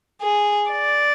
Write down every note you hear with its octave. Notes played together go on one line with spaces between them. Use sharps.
G#4
D5